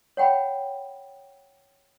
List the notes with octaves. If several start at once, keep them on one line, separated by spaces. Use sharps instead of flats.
C#5 F#5 G5 B5